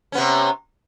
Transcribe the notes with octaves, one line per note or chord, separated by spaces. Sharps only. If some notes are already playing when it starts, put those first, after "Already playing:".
C3 B3 C#4